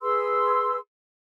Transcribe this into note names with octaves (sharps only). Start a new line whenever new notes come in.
G#4 B4 C6 E6